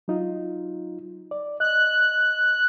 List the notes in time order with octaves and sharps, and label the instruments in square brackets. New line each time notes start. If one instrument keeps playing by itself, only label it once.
[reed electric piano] F#3 D#4 F4
D5
[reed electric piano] D#5 [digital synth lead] F#6